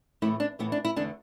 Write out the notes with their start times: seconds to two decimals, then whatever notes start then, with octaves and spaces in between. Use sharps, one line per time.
0.22 A2 E3 A3 E4
0.40 D4
0.59 A2 E3 A3 B3
0.72 D4
0.85 E4
0.96 E2 D3 A3 D4